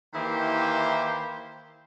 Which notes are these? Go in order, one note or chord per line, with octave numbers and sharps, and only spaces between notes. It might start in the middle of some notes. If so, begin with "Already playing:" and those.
D#3 E3 A#3 E4 G4 C5